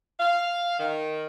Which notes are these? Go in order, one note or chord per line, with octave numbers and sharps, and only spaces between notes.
F5
D#3